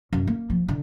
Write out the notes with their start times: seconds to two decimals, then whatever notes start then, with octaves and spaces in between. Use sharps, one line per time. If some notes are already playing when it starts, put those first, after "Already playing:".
0.13 F#2
0.27 A#3
0.50 F3
0.68 D3